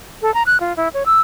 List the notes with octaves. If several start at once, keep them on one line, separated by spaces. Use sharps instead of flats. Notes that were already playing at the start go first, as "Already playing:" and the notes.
A4
A#5
F#6
F4
E4
C#5
E6